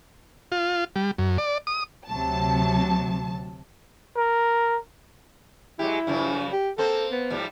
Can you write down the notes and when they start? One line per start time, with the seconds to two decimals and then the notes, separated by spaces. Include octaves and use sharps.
0.52 F4
0.96 G3
1.18 F#2
1.38 D5
1.67 D#6
2.08 D2 C3 F#3 A5
4.17 A#4
5.79 F#3 G#3 E4 G4
6.07 F#2 C#3 F3
6.53 G4
6.78 A#3 C4 A4 C5
7.12 B3
7.30 G#2 F3 G3